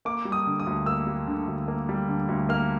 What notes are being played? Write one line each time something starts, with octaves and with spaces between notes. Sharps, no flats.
A#3 D6
G3
D#6
D3
D#6
D2
A#3 E6
G3
D3
D2
A#3
G3
D3
D2
A#3 F6